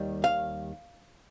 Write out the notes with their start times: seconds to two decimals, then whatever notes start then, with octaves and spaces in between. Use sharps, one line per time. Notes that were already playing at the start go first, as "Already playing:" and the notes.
Already playing: D#2 D#3 G3
0.24 F5